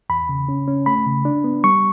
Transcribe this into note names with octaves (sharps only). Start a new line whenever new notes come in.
E2 B5
C#3
C#4
C#4
A3 B5
C#3
D4
B3
G3 C#6